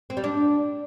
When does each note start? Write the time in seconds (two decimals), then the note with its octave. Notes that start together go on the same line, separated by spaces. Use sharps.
0.10 C4
0.17 G3
0.24 D4